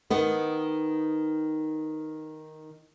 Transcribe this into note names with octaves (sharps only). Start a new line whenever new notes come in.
D#3 B3